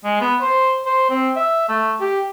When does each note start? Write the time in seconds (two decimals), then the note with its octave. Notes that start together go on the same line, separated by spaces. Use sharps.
0.05 G#3
0.21 B3
0.41 C5
0.86 C5
1.10 C4
1.36 E5
1.69 A3
2.01 G4